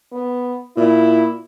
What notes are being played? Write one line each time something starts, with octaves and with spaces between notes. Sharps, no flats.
B3
A#2 E4